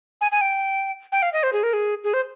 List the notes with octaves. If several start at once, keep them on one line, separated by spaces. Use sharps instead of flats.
G#5
G#5
G5
G5
F5
D#5
C5
G#4
A#4
G#4
G#4
C5